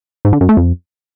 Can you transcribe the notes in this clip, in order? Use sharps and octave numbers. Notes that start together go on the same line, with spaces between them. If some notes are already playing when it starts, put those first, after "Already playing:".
G#2
D3
F#2
A3
F2